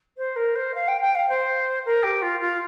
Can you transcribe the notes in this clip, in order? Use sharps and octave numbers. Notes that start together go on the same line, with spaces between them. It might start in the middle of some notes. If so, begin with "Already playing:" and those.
C5
A#4
C5
F5
G5
G5
F5
C5
A#4
G4
F4
F4